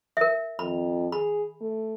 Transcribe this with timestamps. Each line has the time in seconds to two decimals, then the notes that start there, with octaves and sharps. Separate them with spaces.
0.17 A#4 E5
0.59 F2 B5
1.12 G#4 B5
1.61 A3